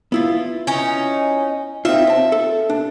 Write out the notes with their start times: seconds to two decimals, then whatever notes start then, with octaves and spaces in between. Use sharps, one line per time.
0.12 B3 E4 F4
0.67 C#4 D#4
1.85 C4 D#4 F4 E5
2.07 C4 A5
2.32 A4
2.70 D4